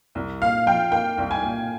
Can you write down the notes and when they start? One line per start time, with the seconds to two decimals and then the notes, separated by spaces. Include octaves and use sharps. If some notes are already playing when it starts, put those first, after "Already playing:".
0.15 C2
0.41 A#2 F5
0.66 F3 G5
0.92 A#3 G5
1.18 C2
1.31 G#5
1.42 A#2